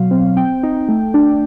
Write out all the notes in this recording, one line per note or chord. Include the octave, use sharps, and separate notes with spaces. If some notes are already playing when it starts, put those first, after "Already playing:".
Already playing: B2 F#3 F5
C4
C4 G5
D#4
A3
D4